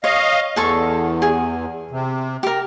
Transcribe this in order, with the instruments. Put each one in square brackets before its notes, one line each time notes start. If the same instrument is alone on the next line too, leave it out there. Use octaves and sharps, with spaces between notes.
[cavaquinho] C#5 [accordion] D#5 F5
[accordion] E2 [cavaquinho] G#4 A4 C#6
[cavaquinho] G#4
[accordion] C3
[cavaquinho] G4 A#4